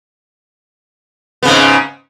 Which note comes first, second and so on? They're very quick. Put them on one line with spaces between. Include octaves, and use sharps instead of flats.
B3 C#3 G#2